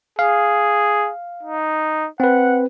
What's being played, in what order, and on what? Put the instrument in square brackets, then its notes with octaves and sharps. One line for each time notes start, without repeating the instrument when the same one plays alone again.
[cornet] G#4 [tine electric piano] F5
[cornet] D#4
[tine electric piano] C4 B4 [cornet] F#5